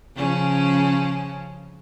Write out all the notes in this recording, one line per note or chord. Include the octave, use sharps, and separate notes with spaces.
C#3 F3 C#4